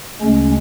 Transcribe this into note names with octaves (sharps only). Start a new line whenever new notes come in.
D2 C#3 G#3 C#4